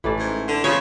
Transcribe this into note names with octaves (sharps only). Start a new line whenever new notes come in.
A1 E3 A3 D5
G#2
D3
C#3 F3 F4 C#5